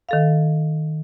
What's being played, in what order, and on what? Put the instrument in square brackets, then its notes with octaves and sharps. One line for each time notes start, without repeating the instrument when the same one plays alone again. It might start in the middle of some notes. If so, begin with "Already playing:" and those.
[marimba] D#3 A4 F5